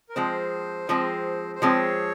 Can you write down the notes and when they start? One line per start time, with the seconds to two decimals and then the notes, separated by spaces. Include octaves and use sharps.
0.09 A#4
0.15 F3 G#3 C4 C5
0.89 F3 G#3 C4
1.55 C5
1.62 F3 G#3 C4 C#5